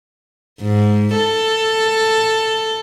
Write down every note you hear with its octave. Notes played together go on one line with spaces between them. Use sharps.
G#2
A4